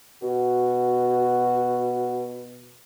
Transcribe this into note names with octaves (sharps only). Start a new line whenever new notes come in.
B2 F#4